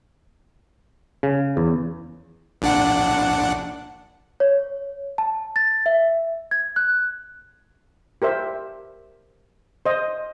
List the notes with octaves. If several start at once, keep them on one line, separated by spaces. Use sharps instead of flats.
C#3
E2
A#1 D4 F#5
C#5
A5
A6
E5
G#6
F#6
G4 A#4 C5 E5
C5 D#5